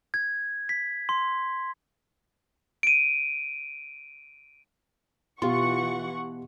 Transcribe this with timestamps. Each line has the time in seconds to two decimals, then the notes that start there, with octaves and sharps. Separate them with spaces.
0.14 G#6
0.69 B6
1.09 C6
2.83 D7 D#7
5.42 B2 E3 F4 G4 F#5 C6 C#6